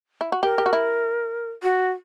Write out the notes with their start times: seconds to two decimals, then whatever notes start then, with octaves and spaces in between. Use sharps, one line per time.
0.21 E4
0.32 F#4
0.43 G4 A#4
0.58 G4
0.66 F#4
0.73 E4
1.63 F#4